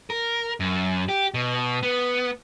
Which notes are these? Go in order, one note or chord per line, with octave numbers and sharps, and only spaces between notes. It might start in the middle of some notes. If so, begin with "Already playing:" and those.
A#4
F#2
G4
B2
B3